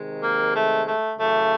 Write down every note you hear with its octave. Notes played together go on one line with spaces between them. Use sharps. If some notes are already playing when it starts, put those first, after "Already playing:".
Already playing: C3 D#3 G#3
A#3
A3
A3
F#2 C#3 E3 A3